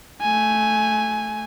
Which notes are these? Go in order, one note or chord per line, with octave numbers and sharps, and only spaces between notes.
A3 G#5